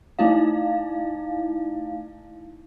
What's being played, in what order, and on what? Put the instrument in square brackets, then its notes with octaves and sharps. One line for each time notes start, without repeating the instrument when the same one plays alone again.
[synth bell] A3 D#4 E4 F5